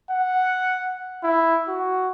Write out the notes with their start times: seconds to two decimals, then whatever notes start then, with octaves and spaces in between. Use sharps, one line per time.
0.11 F#5
1.24 E4
1.69 F#4